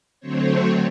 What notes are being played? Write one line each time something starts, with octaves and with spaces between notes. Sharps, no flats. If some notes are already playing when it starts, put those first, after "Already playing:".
D3 F#3 A3 C4 C5 C#5